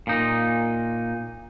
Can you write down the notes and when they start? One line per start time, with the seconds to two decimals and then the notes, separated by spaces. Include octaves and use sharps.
0.07 A#2 D#4